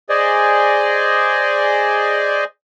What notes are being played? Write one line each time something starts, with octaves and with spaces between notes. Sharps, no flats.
G#4 C5 D5 D#5 G#5